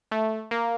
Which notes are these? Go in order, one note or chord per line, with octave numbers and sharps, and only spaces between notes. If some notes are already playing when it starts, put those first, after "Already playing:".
A3
A#3